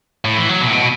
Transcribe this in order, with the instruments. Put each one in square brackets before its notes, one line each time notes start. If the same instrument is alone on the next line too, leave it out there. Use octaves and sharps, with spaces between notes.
[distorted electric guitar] A2
E3
F#3
B2
A2
B2